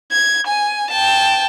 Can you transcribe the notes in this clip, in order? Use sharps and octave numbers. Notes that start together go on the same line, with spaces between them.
G#6
G#5
G5 A5